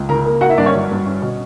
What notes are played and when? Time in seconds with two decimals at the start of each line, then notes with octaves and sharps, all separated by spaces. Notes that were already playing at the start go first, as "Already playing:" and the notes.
Already playing: C#2
0.09 C#3 A#4 A#5
0.26 A#3
0.41 A#3 F#4 F#5
0.49 E4 E5
0.58 G2 D4 D5
0.66 C#4 C#5
0.74 F#3
0.91 G2
1.06 C#4
1.22 B2